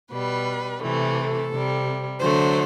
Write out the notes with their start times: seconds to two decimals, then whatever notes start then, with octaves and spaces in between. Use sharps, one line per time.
0.11 B2 G3 B4
0.81 C3 E3 A3
1.16 A4
1.51 C3 G3
2.20 D3 F#3 A3 C5